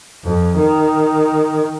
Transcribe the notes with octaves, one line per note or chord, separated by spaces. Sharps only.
F2
D#3